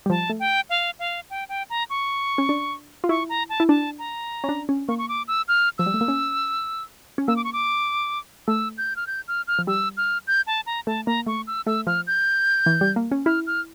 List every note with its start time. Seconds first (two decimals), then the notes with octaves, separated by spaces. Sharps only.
0.06 G3
0.10 F3 A5
0.30 A3
0.40 G5
0.70 F5
0.99 F5
1.30 G5
1.49 G5
1.70 A#5
1.90 C#6
2.38 C#4
2.49 D4
3.04 F4
3.09 E4 C#6
3.29 A#5
3.49 A5
3.60 E4
3.69 D4 A5
3.99 A#5
4.44 C#4
4.49 D4
4.69 C#4
4.88 A#3 C#6
4.98 C#6
5.09 D6
5.28 E6
5.48 F6
5.78 F3 E6
5.86 G3
5.94 A3
6.01 A#3
6.08 C#4
7.18 C#4
7.28 A#3 E6
7.36 D6
7.44 C#6
7.53 D6
8.48 A3 E6
8.78 G6
8.96 F6
9.07 G6
9.28 F6
9.47 F6
9.59 F3
9.67 G3 E6
9.97 F6
10.27 G6
10.47 A5
10.66 A#5
10.87 A3 A5
11.07 A#3 A#5
11.26 A3 C#6
11.47 E6
11.66 A3 E6
11.87 F3 F6
12.07 G6
12.66 E3
12.81 G3
12.96 A#3
13.11 C#4
13.26 E4 F6
13.47 F6